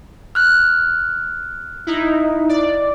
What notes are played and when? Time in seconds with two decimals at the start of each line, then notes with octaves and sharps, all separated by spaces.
0.35 F6 F#6
1.87 D#4 E4
2.49 D5